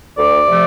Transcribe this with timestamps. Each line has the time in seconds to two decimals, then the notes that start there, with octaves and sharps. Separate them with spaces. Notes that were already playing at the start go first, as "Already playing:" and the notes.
0.18 D2 D5
0.47 C3 F3 A3